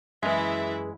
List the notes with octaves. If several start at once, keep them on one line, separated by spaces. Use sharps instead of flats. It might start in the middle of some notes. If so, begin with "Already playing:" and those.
F#2 E3 G#3 E4 G#4 B4 E5